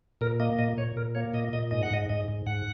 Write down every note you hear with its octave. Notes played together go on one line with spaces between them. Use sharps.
A#2 A#4
A#3 D#5
A#2 D#5
A#2 C#5
A#2 A#4
A#3 C#5
A#2 D#5
A#2 D#5
G#2 D#5
F#5
G#2 D#5
G#2 D#5
G#2
G#2 F#5